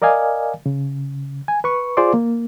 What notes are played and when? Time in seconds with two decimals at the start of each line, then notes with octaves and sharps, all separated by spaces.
0.02 A#4 D5 D#5 F5 G#5
0.66 C#3
1.48 G#5
1.64 B4 C#6
1.97 F4 G#4 C5 D5 C6 D6
2.14 A#3